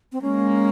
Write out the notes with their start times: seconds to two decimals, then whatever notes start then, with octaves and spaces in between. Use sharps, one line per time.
0.12 C4
0.22 G#3 A#3 C#4